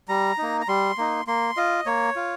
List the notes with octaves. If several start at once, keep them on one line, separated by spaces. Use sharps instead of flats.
G3 A#5
A#3 D#4
A#5
G3 C6
A#3 D#4
A#3 C6
F4 D#5
A#3 C#5
F4